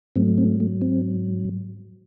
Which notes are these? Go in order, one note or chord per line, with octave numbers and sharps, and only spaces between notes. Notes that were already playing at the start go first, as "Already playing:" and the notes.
G#2 F#3 A3 C4
C4
A3
C4